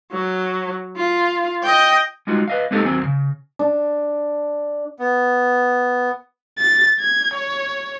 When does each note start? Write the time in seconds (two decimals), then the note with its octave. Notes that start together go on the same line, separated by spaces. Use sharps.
0.12 F#3
0.96 F4
1.63 D#5 G5
2.27 G3 G#3 D#4 F4 F#4
2.48 B4 D#5 F5
2.71 G#3 A#3 C4 D#4 G4 A4
2.85 D#2 F#3 C4 G#5
3.05 C#3
3.59 D4
4.99 B3
6.58 A6
6.99 G#6
7.34 C#5